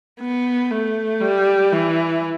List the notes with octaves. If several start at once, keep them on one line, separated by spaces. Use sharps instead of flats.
B3
A3
G3
E3